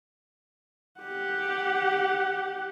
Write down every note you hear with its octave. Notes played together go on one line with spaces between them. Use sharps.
G4 F#5